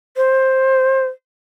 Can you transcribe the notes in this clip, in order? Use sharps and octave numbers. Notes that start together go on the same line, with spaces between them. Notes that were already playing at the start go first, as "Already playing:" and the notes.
C5